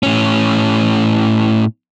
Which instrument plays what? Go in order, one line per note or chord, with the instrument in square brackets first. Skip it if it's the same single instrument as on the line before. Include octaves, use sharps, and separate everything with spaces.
[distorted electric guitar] A2 C#4